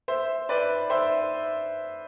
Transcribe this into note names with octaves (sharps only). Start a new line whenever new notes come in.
C5 E5
B4 D5
C5 E5